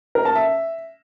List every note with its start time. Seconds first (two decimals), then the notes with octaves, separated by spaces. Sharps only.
0.15 A#4
0.25 A5
0.35 E5